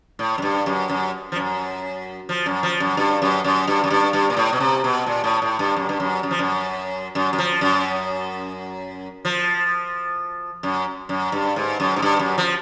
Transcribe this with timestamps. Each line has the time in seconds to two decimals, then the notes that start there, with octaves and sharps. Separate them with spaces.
0.19 A2
0.38 F#2
0.42 G2
0.66 F#2
0.89 F#2
1.32 F3
1.36 F#2
2.29 F3
2.46 F#2
2.63 F3
2.80 F#2
2.97 G2
3.22 F#2
3.44 F#2
3.67 G2
3.84 F#2
3.90 G2
4.13 G2
4.30 A#2
4.37 A2
4.53 B2
4.60 C3
4.84 B2
5.06 A#2
5.24 A2
5.42 A2
5.59 G2
5.77 F#2
5.89 G2
6.00 F#2
6.23 F#2
6.31 F3
6.39 F#2
7.15 F#2
7.33 F#2
7.38 F3
7.61 F#2
9.25 F3
10.63 F#2
11.09 F#2
11.32 G2
11.56 G#2
11.80 F#2
11.96 G#2
12.02 G2
12.19 F#2
12.38 F3